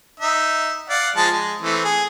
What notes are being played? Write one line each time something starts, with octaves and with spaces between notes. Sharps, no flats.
D#4 E5
D5 F5 F#5
F3 G#3 A5
G#3
E3 A3 C4
G#4